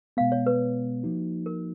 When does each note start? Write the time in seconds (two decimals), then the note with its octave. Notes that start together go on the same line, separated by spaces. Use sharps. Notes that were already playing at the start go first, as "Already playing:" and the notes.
0.17 B2 G#3 B3 F5
0.32 C#5
0.46 B4
1.03 F3 A#3 D#4 F#4
1.46 A#4